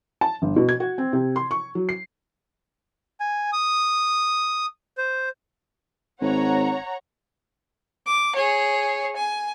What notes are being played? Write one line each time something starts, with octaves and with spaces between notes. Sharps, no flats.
A5
G1
B2
G#6
F#4
C4
C3
C6
C#6
F#3
C7
G#5
D#6
C5
G#1 C#5 F#5 A#5
D6
G#4 C#5
G#5